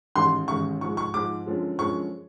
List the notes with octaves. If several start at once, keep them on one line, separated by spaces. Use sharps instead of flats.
A1 G#2 D#3 G#3 C6
A1 G#2 D#3 G#3 C#6
G#2 F3 G#3 C#6
C#6
G#2 F3 G#3 D6
F#2 D3 F3 G#3
F#2 D3 F3 G#3 C#6